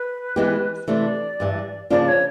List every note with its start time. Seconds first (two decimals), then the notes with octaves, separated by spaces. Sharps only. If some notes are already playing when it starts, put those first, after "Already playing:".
Already playing: B4
0.36 E3 G#3 B3 E4 G4
0.88 C3 E3 A3 D4 D5
1.40 G2 E3 G3
1.90 C#3 F3 A#3 D4 F4 D5
2.08 C#5